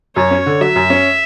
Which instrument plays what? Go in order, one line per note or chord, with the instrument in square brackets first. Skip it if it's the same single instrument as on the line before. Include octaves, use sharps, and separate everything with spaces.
[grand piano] F#2 [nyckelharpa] C#5
[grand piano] C#4
D3
[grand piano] F#3 [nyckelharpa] E5
[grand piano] F#2
C#4